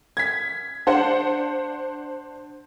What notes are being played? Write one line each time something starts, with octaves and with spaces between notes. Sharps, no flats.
G#6 B6
D4 C5 F#5